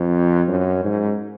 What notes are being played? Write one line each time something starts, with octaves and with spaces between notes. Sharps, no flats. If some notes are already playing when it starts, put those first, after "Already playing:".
Already playing: F2
F#2
G#2